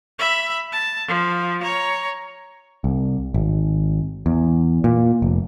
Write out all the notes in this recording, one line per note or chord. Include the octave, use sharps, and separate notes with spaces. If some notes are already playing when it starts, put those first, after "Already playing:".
E5 B5
A5
F3
C#5 A#5
C2
G#1
E2
A#2
F1